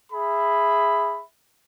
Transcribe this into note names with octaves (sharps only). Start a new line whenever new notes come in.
G#4 E5 B5